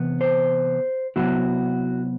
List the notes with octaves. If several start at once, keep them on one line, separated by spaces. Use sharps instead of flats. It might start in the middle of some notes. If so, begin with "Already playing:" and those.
Already playing: C3 E3 B3
C5
C3 F#3 B3 E4 F#4